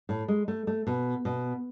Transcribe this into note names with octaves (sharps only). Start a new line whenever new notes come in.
A2
G#3
A3
A3
B2
B2